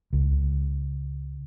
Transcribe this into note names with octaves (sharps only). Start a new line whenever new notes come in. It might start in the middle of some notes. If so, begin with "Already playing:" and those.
C#2